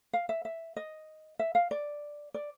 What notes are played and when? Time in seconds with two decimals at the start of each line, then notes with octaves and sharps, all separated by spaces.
0.13 F5
0.29 E5
0.45 E5
0.76 D#5
1.39 E5
1.55 F5
1.71 D5
2.34 D5